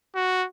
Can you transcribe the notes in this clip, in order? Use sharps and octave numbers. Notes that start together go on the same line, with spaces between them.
F#4